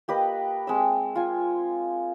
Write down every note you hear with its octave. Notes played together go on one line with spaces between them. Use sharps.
A#3 G4 B4 D#5
G#3 C4 E6
F4 G#5